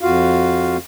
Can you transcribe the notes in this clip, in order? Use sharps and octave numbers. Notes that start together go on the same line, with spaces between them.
F2 F4 F#4 F5